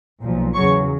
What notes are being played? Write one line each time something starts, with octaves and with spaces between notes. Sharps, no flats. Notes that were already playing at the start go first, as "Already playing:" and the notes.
B1 A#2 F3
E2 C#3 F#3 C#5 C#6